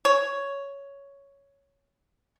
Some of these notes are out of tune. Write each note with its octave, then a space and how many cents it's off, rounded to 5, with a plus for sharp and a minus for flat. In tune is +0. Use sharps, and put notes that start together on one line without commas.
C#5 +5